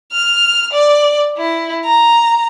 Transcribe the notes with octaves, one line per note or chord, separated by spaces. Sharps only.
F6
D5
E4
A#5